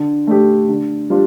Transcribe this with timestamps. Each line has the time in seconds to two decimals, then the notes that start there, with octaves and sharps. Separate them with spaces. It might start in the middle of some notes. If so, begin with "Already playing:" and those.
Already playing: D3
0.27 A3 D4 G4
0.69 D3
1.10 G3 D4 F4